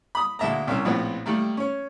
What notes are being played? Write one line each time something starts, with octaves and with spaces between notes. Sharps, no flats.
B5 D#6
D2 G#3 A#3 E5 A5 A#5
C2 C#4 A#4 E6
A#1 A2 B3 C4 F4 B4
D#3 G3 A3 A#3
C#4 C#5